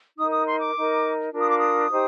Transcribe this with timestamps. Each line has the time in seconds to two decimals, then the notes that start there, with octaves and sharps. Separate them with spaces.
0.17 D#4 A#4 D#6
0.32 D#6
0.46 C6
0.60 D6
0.75 D#4 A#4
1.32 D4 F4 A#4
1.41 D#6
1.49 D6
1.58 D#6
1.91 D#4 G4 C5